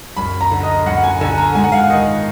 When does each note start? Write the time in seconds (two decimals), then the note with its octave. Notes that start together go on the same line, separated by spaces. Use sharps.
0.17 F#2 B5
0.41 A#5
0.52 D3
0.63 D#5
0.86 F#2 F#5
1.04 G#5
1.21 D3 G#5
1.38 A#5
1.55 G#2 G#5
1.64 F#5
1.72 F5
1.80 F#5
1.90 D#3 D#5